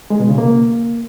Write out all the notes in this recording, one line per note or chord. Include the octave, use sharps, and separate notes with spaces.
G#3
B2
C#3
A#3